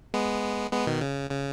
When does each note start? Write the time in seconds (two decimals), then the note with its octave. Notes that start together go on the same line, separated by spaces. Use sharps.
0.14 G#3 B3
0.72 G#3 B3
0.87 B2 D#3
1.01 C#3
1.31 C#3